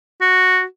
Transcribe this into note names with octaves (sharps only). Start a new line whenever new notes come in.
F#4